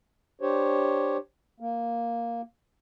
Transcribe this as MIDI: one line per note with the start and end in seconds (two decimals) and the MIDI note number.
0.42 1.17 62
0.42 1.17 67
0.42 1.17 72
0.42 1.17 73
1.60 2.41 58